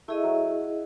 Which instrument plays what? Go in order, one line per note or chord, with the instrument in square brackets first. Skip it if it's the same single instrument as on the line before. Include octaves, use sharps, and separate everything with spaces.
[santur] A3 [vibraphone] E4 G#4 D#5
[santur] F#3